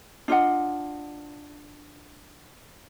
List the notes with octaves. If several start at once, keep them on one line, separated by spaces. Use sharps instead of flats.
D4 F4 D#5 F#5